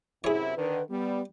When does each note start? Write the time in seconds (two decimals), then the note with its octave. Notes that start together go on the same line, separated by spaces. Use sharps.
0.24 F#2 C3 E4 G#4 C#5
0.56 D3 D#3 B4
0.89 G3 B3